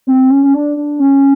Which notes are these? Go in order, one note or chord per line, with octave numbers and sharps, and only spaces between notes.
C4
C#4
C#4
D4
D4
C#4